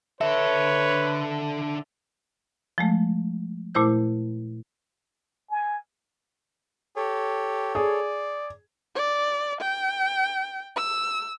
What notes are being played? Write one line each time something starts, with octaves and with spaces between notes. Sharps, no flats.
D3 A4 B4 C#5 E5
F3 G#3 A3
A#2 A3 E4 C5 G6
G#5
G4 A4 C#5
G#4 D5
D5
G5
E6